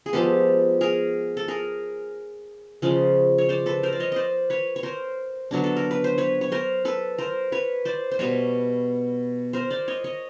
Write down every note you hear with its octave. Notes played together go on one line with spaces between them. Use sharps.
G#4
F3 G#3 B3 G4 A4
G#4 A#4
A4
G#4 A#4
C#3 F3 G#3 C#4
C#5
C5 D5
A4 B4
A#4 C5
D5
C#5 D#5
C5 D5 D#5
B4 C#5
C#5
A#4 C5
D3 F#3 B3 D4
A4
A#4
B4
C5
B4 C#5
C#5
A#4 C5
A4 B4
A#4 C5
B4 C#5
C5 D5
C5
B2 G3 B3 B4 C#5
A#4 C5
C5 D5
C#5 D#5
C#5 D#5